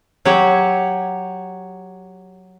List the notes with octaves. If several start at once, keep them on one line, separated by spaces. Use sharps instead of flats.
F#3 G4 C#5